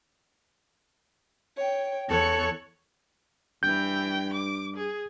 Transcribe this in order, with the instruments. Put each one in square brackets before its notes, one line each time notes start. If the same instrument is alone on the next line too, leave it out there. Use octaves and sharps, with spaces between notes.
[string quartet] C#5 G5
E2 A4 C#5 C#6 F#6
[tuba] G2 [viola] E3 G5 [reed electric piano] G6
[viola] D6
G#4